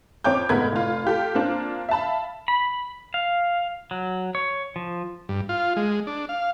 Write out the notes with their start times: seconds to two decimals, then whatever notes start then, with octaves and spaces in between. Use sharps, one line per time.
0.24 F2 C4 C#5 G5 D6 G6
0.49 F1 G#2 B3 A#4 B5 G#6
0.72 F1 F4
1.05 F4 G4 A4
1.35 A#3 C4 D4 F4
1.89 E5 F5 A5 B5
2.48 B5
3.14 F5
3.91 F#3
4.35 C#5
4.76 F3
5.29 G2
5.49 F4
5.76 G#3
6.07 D4
6.29 F5